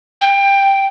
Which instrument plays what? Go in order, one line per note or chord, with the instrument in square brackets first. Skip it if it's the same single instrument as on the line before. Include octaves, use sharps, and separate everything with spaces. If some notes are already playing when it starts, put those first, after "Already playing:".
[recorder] G5